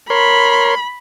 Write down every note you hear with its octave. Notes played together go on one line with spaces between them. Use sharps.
A#4 C#5 B5 C6